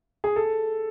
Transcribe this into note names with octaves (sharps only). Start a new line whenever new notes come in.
G#4
A4